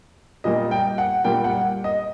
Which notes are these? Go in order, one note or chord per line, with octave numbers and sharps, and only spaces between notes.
A#2 G3 A#3 D#5
G5
F#5
A#2 G3 A#3 G5
F#5
D#5